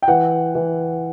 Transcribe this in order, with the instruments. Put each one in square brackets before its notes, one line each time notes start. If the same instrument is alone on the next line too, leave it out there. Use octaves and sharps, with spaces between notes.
[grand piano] G5
E3 F#5
E3